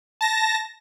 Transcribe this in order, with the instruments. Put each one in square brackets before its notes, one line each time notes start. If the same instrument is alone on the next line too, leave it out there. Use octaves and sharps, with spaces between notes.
[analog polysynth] A5 A#6